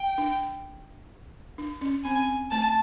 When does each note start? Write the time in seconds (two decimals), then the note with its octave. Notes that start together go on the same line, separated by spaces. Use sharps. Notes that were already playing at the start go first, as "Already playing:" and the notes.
Already playing: G5
0.18 D4
1.58 D4
1.81 C#4
2.04 C4 G#5
2.51 A3 A5